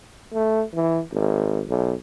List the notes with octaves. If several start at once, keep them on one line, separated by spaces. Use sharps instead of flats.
A3
E3
G#1
B1